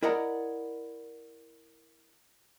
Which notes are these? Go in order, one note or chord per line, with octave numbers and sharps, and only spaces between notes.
E4 A#4 D5 D#5 F#5 A#5